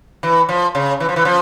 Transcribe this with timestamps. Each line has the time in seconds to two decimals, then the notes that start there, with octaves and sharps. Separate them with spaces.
0.23 E3
0.49 F3
0.75 C#3
1.00 E3
1.09 F3
1.16 E3
1.25 F3